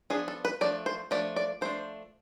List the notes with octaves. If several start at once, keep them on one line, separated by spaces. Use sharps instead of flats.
F3 B3 D4 G#4
A4
B4
F3 A3 D4 D5
C5
F3 A3 D4 D5
D5
F3 A3 D4 C5